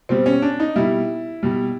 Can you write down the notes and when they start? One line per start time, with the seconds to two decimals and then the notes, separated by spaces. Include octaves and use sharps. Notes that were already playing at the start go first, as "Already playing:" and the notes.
0.09 B2 G3 C4
0.26 C#4
0.42 D4
0.60 D#4
0.76 B2 G3 E4
1.43 B2 G3